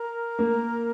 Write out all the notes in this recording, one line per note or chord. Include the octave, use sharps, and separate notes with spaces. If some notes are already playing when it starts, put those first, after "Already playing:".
Already playing: A#4
A#3